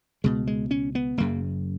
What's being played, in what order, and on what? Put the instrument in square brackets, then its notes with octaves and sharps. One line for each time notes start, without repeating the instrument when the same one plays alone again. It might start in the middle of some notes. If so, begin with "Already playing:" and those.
[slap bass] C#2 B2 G#3
G#3
C#4
B3
F#1 F#2 C#3 A#3